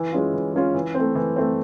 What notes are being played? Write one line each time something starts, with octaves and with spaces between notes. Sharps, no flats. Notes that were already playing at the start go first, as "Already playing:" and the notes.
Already playing: E3
G#3 C#4 F4
E3
G#3 C#4 F4
E3
A3 C4
E3
A3 C4